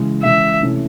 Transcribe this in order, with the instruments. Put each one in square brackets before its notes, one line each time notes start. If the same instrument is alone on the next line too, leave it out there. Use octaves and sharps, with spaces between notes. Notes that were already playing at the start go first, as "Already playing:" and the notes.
Already playing: [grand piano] C#3 E3 G#3
[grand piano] C#3 E3 G#3 [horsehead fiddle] E5
[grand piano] C3 E3 A3 C#4 E4